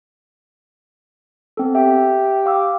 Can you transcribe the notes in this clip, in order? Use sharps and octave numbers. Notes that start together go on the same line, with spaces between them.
B3 C4 A4
G4 E5
F5 D6 E6